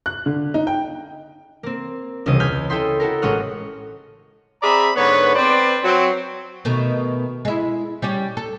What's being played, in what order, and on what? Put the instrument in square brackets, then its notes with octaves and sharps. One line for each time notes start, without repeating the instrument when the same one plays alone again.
[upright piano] F#6
D3
D#4
G5
[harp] A#3 C4
E1 C#2 C3 G3 D#5 D#6
G#5 B5 F6 G6 G#6
E4 A4 D#5 G5 B5 C6
E4 F#4 A4 A#4
A1 G#3 C#5 D#5 F#5 F6
[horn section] C4 G#4 D5 E5 A#5 B5
G#2 D3 B3 B4 C#5
C4 B4 C5 D5
F#3 C4
[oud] B2 D#3 A3
G#3 E4
G3 C#4 G4
A4